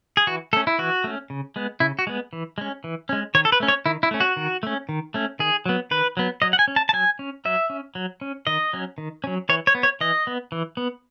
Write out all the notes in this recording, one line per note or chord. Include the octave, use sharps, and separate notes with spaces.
G#4
E3 F#4
A3 C#4 A4
E4
E3 F#4
A3 C#4
C#3
G#3 B3
C#3 E4
F#4
G#3 B3
E3
G#3 C#4
E3
G#3 C#4
D#3 C#5
A4
B4
A3 C#4
C#5
D#3 E4
E4
A3 C#4
F#4
D#3
A3 C#4
D#3
A3 C#4
D#3 G#4
F#3 B3
D#3 B4
F#3 B3
F#3 D#5
F#5
G#5
C#4
A5
A5
F#3 G#5
C#4
F#3 E5
C#4
F#3
C#4
D#3 D#5
F#3 C#4
D#3
F#3 C#4
E3 C#5
C#5
B3
C#5
E3 D#5
B3
E3
B3